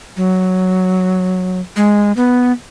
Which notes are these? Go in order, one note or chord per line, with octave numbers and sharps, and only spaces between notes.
F#3
G#3
B3